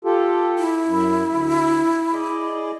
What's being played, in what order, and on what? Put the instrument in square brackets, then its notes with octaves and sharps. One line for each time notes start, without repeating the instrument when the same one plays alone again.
[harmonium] F4 G4 A4
[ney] E4
[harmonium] F#2
D2
G#4 D5 D#5